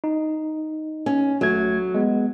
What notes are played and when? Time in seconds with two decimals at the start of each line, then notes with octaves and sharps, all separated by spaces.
0.04 D#4
1.06 C#4
1.41 G#1 F#3 A3 G#6
1.95 G#3 B3